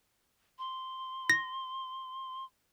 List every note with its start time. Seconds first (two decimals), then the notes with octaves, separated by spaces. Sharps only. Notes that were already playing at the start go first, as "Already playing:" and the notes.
0.59 C6
1.30 A#6